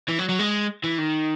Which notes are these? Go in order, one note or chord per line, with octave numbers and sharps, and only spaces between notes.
E3
F#3
F#3
G#3
E3
D#3